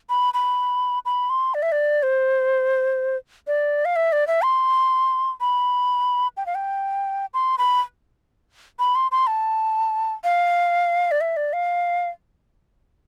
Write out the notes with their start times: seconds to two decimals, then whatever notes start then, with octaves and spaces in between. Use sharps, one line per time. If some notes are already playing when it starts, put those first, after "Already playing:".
0.09 B5
0.34 B5
1.05 B5
1.30 C6
1.54 D5
1.62 E5
1.72 D5
2.03 C5
3.47 D5
3.85 F5
3.96 E5
4.12 D5
4.27 E5
4.43 C6
5.41 B5
6.37 G5
6.46 F5
6.55 G5
7.34 C6
7.58 B5
8.79 B5
8.95 C6
9.12 C6
9.27 A5
10.24 F5
11.11 D5
11.21 E5
11.37 D5
11.53 F5